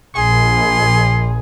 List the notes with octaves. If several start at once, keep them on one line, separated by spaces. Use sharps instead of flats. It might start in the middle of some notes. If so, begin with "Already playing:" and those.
A#1 G#4 C6